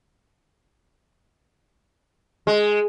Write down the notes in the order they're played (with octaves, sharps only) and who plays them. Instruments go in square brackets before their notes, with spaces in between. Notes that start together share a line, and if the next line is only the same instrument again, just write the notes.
[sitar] G#3